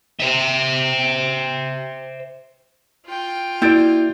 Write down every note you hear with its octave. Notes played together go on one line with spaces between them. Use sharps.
C5 E5
F4 G5
A#3 E4 F#4 D5 G6 A6 D7